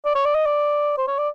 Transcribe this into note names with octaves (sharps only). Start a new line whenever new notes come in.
D5
C#5
D5
D#5
D5
C5
C#5
D5